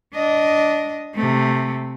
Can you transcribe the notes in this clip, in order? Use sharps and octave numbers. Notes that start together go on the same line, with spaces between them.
D4 D#5
C3 A3